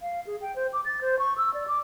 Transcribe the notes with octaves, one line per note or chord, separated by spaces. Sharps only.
F5
G#4
G5
C5
D6
A6
C5
C#6
E6
D5
D6